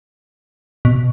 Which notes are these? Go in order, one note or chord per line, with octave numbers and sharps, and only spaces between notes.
B2